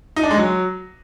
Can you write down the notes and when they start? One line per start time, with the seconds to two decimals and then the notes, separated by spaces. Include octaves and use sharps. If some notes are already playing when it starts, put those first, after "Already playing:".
0.16 D#4
0.23 D4
0.31 G#3
0.38 F#3